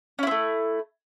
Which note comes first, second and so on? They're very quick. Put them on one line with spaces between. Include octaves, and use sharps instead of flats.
C#4 E4 C4 A3